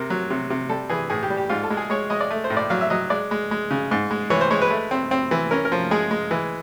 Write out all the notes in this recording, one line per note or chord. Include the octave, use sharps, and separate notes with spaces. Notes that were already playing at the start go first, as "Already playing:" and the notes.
Already playing: C3 A#4
F#3
C3
C3
G3 A4
E3 G#4
A2 G#4
G4
G3
G4
G#2 F4
A4
G#3
G#4
G#3 C#5
G#3 D#5
D5
A3
C5
A2
D5
F#3 F5
E5
F#3 D#5
G#3 D5
G#3
G#3
C#3
G#2
G#3
E3 C#5
C5
G#3 C#5
B4
A3
C4
C4
E3
C#4 A#4
A#4
F3
G#3 G#4
G#3
E3